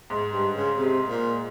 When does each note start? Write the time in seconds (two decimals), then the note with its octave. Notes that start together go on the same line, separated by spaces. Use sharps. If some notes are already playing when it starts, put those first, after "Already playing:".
0.10 G#2
0.32 G2
0.54 C#3
0.75 C3
1.09 A#2